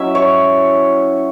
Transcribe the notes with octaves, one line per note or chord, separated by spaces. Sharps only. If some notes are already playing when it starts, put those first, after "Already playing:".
Already playing: F#3 C#4 E4 E5
C#5